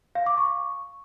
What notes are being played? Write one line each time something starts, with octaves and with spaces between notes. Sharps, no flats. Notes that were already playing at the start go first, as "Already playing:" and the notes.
F5
D6
C#6